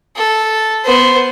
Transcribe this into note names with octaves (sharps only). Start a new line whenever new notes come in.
A4
B3 C5